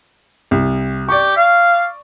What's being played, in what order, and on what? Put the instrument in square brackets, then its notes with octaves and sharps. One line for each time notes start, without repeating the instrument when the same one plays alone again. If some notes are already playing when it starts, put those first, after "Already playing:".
[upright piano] C2
[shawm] G4 [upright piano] D5 C#6
[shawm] F5